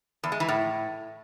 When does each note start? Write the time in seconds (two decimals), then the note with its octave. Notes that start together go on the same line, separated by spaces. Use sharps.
0.24 E2
0.32 G#3
0.40 E3
0.48 A2